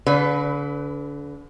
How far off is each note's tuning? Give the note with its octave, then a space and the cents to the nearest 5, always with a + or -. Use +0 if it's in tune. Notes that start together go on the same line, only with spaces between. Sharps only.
D3 -35 B4 +10